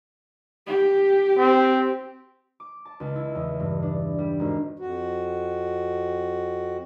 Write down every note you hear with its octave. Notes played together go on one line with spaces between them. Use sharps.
G4
C4
D6
A5
C#2
E4
E2
G2
D4
G3
G#1
F2 F#4